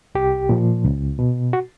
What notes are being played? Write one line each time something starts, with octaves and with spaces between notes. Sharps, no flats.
C2 G4
A#2 F3
C#2
B2
F#4